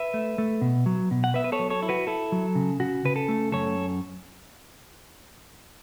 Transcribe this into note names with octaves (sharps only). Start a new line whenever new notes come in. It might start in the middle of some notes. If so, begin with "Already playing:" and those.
Already playing: B4 E5
A3
A3
B2
F#3
B2
F#5
B3 B4 E5
B4
A4 C#5
F#3
A4 C#5
E4
F#4 B4
E4 A4
F#3
C#3
C#3 F#4
C#3 B4
A4
A3
F#2 A4 C#5